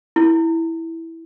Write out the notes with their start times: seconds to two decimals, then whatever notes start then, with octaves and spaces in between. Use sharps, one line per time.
0.16 E4